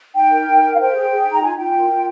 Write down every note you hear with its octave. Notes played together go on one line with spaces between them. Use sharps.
D#4 G5
A#4
D#4
A#4
F5
C5 G5
G#4
G#4
D#4
A#5
F4 G#5
F4 G5
A#4
F4